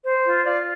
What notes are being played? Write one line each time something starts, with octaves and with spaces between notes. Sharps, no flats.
C5
F4
F4 D5 F5